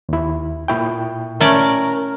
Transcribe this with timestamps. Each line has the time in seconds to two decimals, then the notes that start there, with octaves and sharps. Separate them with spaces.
0.09 D#2 E4
0.68 A#2 E4 G5
1.41 A3 C#4 A#4 D5